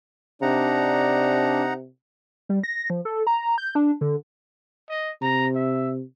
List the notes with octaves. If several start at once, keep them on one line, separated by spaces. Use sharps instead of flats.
C3 D4 D#4 F#5 A#5
G3
A#6
F3
A4
A#5
G6
D4
D3
D#5
C3 A#5
E5